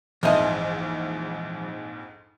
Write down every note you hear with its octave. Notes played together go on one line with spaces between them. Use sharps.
A#1 F2 G#2 E3 F3 D#5